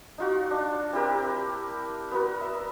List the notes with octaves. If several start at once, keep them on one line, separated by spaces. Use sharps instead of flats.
D#4 F4 F#4
D4
C4 E4 G4 A#4
B3 F#4 A#4
E5